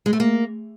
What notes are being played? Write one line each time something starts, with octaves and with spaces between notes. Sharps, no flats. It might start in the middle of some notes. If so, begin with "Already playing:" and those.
G#3
A3
A#3